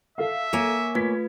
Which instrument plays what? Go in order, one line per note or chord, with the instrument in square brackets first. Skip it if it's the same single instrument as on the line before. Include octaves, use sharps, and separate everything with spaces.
[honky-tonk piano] A4 F5 [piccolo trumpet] E5
[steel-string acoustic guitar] A#3 C#5 G#5
[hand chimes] A3 F4 B4 [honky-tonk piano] G#6 B6